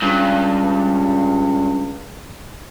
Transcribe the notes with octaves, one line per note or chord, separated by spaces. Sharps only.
C#2 G2